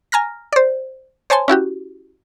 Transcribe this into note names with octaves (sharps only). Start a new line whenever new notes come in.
G#5 A#5 F6 A#6
C5 D5
C5 C#5 G#5 A5 C6
C#4 E4 F#4 G4